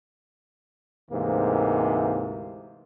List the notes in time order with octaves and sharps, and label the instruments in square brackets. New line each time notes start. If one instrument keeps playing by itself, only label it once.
[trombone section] D2 G#2 C3 E3 A#3